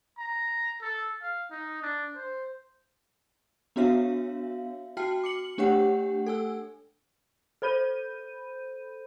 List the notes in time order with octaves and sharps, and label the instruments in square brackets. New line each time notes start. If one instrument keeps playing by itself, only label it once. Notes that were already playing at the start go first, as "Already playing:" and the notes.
[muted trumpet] A#5
A4
F5
D#4
D4
C5
[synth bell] B3 D4 F#4 C#5 E5 F5
F#4 G5 A5 F6 C7
D6 C#7 F#7
A3 D4 G4 C#5 F#5 G5
A4 G#5 E6
A4 C5 B5 G6 D#7